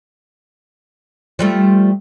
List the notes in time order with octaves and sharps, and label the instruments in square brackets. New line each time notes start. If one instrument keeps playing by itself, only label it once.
[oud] F3 G3 A3